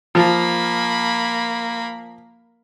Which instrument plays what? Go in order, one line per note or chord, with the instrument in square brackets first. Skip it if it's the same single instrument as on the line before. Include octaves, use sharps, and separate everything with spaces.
[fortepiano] F3 [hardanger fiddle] A#3 B5